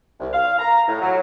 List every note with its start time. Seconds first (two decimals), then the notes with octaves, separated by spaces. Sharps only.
0.20 C2
0.33 F5
0.59 A#5
0.88 A2
1.02 F#3